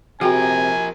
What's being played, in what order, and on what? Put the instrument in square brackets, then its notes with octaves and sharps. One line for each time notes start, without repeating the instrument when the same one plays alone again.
[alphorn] C3 [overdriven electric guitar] F3 A#4 [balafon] F#4 G#4 G5 [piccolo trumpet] G#5